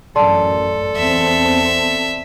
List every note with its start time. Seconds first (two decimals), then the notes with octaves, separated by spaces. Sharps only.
0.16 A1 F#2 A4 D5 A5 C6
0.97 E2 C4 E5